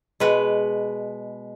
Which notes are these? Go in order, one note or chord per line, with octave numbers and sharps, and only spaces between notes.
B2 G#3 B4